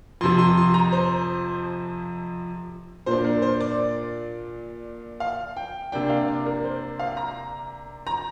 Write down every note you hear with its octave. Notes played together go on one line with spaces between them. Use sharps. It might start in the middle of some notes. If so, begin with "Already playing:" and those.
F2 C3 F3 C6
C6
C6
A#5
C5
A#2 A#3 D4 C5
A#4
C5
D5
F5
G5
C3 A#3 D4 G5
F5
D5
A#4
C5
F5
A#5
A#5